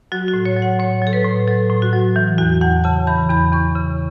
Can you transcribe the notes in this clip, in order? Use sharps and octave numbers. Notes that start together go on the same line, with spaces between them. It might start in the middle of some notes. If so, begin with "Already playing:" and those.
F#3 F#4
F#4
A2
C#5
F#3
F#5
A2 C#5
F#3 A4
B4
A2
F#3 A4
A2
F#4
F#3
E3
E2 F#4
E2 F#5
C#3 A5
E3 B5
E2 B5
E2 C#6
C#3